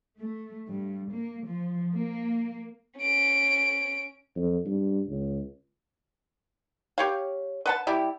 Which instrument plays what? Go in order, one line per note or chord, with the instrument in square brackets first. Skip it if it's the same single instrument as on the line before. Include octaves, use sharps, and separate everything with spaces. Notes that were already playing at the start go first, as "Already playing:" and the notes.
[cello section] A3
G2
A#3
F3
A#3
[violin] C#4 D7
[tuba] F2
G2
C#2
[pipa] G4 C#5 F5
B4 F#5 A5
G3 E4 G4